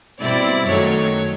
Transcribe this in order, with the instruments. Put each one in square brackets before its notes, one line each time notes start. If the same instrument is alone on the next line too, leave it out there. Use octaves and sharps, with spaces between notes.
[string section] B2 G3 C4 E4 D5
F#2 D#3 F#3 A3 C#5